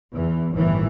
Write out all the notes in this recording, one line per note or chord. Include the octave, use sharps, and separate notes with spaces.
E2 E3
G1 A2 D#3 E3